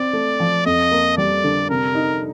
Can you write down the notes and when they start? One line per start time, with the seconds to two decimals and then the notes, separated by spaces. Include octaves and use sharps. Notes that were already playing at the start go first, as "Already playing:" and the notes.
Already playing: C4 D5
0.13 A3
0.40 F3
0.66 F2 D#5
0.91 A#3
1.18 G3 D5
1.44 D3
1.70 C3 A#4
1.95 D#4